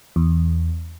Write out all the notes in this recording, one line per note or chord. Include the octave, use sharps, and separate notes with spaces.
E2